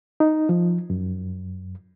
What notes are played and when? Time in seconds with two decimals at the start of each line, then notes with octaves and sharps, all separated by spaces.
0.20 D#4
0.49 F3
0.90 F#2